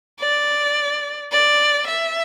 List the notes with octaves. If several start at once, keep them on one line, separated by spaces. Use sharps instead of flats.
D5
D5
E5